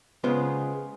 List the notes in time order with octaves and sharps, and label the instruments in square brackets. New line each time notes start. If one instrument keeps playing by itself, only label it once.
[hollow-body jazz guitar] C#3 G#3 B3 F4 C5